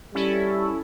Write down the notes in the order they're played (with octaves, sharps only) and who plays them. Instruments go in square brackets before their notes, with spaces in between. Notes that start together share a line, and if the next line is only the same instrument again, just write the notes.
[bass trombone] G3 [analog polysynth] C#4 E4 A4